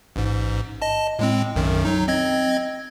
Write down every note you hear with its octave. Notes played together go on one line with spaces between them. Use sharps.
A1 G#2
D#5 A5
A2 G#3 C4
B1 F#2 D#3
F#3 D#4
C4 D#5 G#6